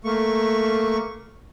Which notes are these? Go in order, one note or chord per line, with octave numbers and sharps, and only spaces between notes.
A3 A#3 C#6